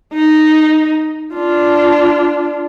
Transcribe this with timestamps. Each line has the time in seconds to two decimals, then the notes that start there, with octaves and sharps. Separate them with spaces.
0.14 D#4
1.34 D4 F4